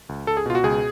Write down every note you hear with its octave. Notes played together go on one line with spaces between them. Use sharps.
C#2
C#2 A4
G#4
B2 F4
F#4
C#2 G#4